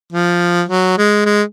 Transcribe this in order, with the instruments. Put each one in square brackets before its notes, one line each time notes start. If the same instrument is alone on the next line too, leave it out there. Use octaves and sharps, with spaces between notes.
[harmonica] F3
F#3
G#3
G#3